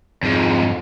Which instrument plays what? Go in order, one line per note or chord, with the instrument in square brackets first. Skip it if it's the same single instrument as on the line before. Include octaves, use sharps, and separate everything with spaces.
[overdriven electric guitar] F2 G#2